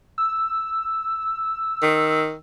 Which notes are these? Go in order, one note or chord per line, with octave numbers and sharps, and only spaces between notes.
E6
D#3